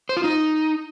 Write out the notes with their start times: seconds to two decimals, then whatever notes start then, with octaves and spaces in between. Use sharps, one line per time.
0.09 C5
0.17 F4
0.24 D#4